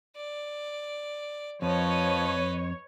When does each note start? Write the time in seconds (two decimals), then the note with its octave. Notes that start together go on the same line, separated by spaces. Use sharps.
0.16 D5
1.62 F2 F3 B4 C#5 D#5